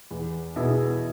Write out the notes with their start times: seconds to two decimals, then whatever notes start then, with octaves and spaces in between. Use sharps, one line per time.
0.11 E2
0.56 B2 B3 E4 G#4